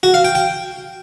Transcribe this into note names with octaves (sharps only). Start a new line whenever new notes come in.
F#4
F5
G5
G5